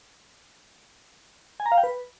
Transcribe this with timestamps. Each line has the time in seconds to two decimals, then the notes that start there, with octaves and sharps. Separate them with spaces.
1.60 G#5
1.66 A#5
1.72 F5
1.78 G5
1.83 B4